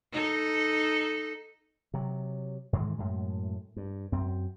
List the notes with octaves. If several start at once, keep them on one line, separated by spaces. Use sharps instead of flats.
D#4 A4
C3 F#3
G#2 D#3 E3 G#3
F#2 A2 G#3
G2
F#2 C4